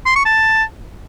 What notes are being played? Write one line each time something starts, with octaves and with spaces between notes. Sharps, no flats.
C6
C#6
A5